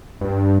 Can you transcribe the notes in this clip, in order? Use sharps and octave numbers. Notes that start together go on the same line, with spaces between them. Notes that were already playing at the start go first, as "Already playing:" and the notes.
G2